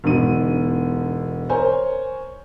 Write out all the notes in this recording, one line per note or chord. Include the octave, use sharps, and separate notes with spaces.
E1 D3 D#4 D#7
A#4 C5 C#5 G#5